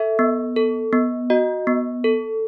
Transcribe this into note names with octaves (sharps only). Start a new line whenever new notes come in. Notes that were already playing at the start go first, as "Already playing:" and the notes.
Already playing: A4 E5
B3
A4
B3
F#4 D#5
B3
A4